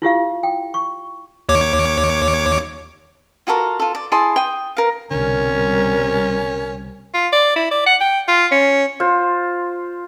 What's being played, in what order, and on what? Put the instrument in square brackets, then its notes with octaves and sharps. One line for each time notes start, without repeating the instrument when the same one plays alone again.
[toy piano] E4 F4 G4 F5
G5
C#6
[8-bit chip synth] D#2 C#5 D6
[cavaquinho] F4 F#4 A4 A#4
F4 A4
D5
E4 G#4 A5 C6
G5 D#6
A#4 F5
[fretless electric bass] C2 D3 [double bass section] B2 G3 C4 [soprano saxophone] C#4 [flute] A#4
[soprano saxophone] F4
D5
E4
D5
F#5
G5
F4
C#4
[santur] F4 C5